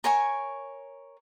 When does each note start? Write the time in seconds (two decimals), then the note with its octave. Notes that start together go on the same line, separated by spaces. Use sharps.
0.04 A#4 C#5 G#5 C#6